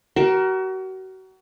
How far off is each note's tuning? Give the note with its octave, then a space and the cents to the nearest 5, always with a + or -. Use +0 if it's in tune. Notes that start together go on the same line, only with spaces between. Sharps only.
F#4 +35 A#4 +15